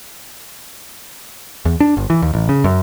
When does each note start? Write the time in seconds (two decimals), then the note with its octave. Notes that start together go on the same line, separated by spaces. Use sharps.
1.65 E2
1.80 D4
1.97 G1
2.10 E3
2.22 D#2
2.34 A1
2.49 C#3
2.64 F#2